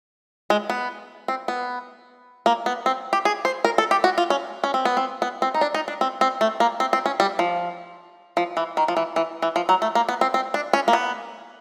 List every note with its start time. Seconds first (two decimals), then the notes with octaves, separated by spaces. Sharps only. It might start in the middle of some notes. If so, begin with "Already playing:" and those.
0.50 G#3
0.70 B3
1.28 C4
1.48 B3
2.46 A#3
2.66 B3
2.86 C4
3.13 G4
3.25 G#4
3.45 C5
3.65 A#4
3.78 A4
3.91 G4
4.04 F#4
4.18 F4
4.30 C#4
4.64 C#4
4.74 C4
4.85 B3
4.97 C4
5.22 B3
5.42 C4
5.54 D#4
5.61 D4
5.74 D#4
5.88 D4
6.01 C4
6.21 C4
6.41 A3
6.60 A#3
6.80 C4
6.93 C4
7.06 C#4
7.20 G3
7.39 F3
8.37 F3
8.57 E3
8.77 D#3
8.88 F3
8.97 E3
9.16 E3
9.42 E3
9.56 F3
9.69 F#3
9.82 A3
9.95 A#3
10.09 B3
10.21 C4
10.34 C4
10.54 D4
10.73 C#4
10.88 A#3
10.93 B3